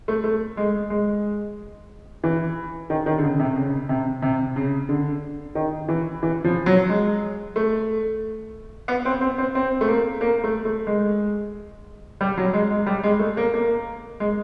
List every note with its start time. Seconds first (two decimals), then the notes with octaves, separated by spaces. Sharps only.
0.08 A3
0.24 A3
0.57 G#3
0.90 G#3
2.24 E3
2.90 D#3
3.06 D#3
3.18 D3
3.23 C#3
3.40 C3
3.56 C#3
3.89 C3
4.22 C3
4.56 C#3
4.89 D3
5.55 D#3
5.88 E3
6.23 E3
6.44 F3
6.66 F#3
6.89 G#3
7.56 A3
8.88 B3
9.05 C4
9.21 C4
9.38 C4
9.55 C4
9.81 A3
9.87 A#3
10.21 A#3
10.44 A3
10.65 A3
10.87 G#3
12.21 G3
12.37 F#3
12.54 G#3
12.70 G#3
12.86 G3
13.03 G#3
13.19 A3
13.37 A#3
13.54 A#3
14.20 G#3